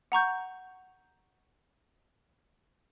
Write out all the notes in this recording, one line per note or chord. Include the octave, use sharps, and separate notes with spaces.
F#5 A#5 C#6 G6